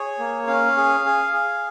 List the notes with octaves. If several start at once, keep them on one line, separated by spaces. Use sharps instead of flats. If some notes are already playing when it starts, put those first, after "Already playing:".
Already playing: G#4 C#5
A#3
C#4 F5
G#4
G#4
G#4